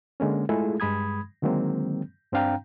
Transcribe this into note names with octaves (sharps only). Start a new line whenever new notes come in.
D3 G#3 A#3 C#4
G#3 A3 E4 F4 G#4 A4
G2 G#3 B5 D#6 G#6
D3 D#3 F#3 G#3 A#3 C4
G2 C4 D4 F5 G5 A#5